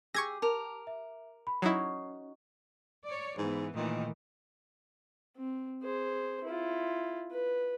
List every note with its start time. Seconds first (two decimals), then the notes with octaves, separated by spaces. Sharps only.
0.14 G4 G#4 C#6 E6 G#6 A#6
0.42 A#4 A5 D6 F7
0.87 E5
1.47 B5
1.62 F#3 C#4 D#4 E4 F#4 C7
3.05 C#5 D5
3.38 G#2 E3 B3
3.76 A#2 D#3 E3 A3
5.37 C4
5.82 G#4 C5
6.44 E4 F4
7.31 B4